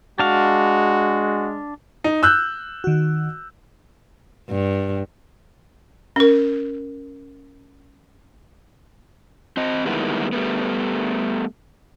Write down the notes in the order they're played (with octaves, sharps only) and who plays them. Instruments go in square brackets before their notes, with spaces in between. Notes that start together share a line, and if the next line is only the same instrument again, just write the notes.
[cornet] G#3 [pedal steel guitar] D4 F5 [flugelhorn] F#4
[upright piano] D#4
E6 F#6 G6
[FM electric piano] D#3 F#4
[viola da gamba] G2
[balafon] C#4 A#4
[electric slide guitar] C4 D#5
D#3 G3 G#3 A#3 B3 E4
G3 A3 B3